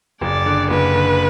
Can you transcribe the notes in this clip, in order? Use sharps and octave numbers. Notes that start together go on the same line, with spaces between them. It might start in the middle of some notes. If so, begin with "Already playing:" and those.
F#1 D5
D3
F#1 B4
D3